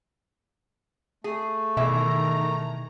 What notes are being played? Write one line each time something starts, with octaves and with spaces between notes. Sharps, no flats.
A3 G#4
B2 D#3 E3 G#4 E5 A#5